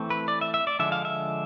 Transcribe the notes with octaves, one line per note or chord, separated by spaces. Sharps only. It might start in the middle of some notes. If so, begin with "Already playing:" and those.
Already playing: E3 A3 C4
B4
D5
E5
E5
D5
D3 F3 G#3 E5
F5
E5